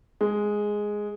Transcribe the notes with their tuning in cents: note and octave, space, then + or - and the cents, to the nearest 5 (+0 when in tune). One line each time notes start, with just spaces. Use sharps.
G#3 +0